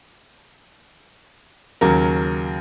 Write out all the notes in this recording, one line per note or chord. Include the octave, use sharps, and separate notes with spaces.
D#2 C#3 F#3 A#4